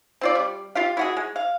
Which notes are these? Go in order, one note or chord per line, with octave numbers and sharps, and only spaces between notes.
C4 F4 D5
G3
F4 G4 F5
E4 F#4 G#4
G#3
F5